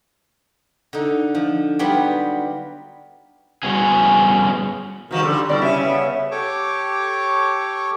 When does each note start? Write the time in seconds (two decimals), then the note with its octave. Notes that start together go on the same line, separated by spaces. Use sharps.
0.93 D3 D#4
1.35 F3
1.79 F#3 G3 B3 F4 G4
3.63 G3 B3 C#4 F#4 G#4
5.11 G#2 D#3 F3 G3 F#4 A#4
5.23 D3 G3 A4
5.49 B2 G3 E4 D5
5.61 C#3 E5
5.85 B3
6.31 G4 A4 C#5 C#6 D6